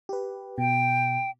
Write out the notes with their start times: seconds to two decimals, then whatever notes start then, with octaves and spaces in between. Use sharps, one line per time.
0.09 G4 B4
0.58 B2 G5